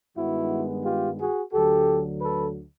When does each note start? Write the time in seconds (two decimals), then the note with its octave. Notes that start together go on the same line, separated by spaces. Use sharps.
0.16 G2 D#3 G#3 B3 E4 F#4
0.84 F4 G4
1.19 F#4 G#4
1.53 D2 D3 F#3 G4 A4
2.21 A4 B4